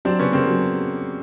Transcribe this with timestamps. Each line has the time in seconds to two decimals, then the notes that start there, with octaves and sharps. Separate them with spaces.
0.05 F#3 C4 D4
0.19 C#3 B3 C#4
0.33 C#3 A#3 C4
0.47 F#3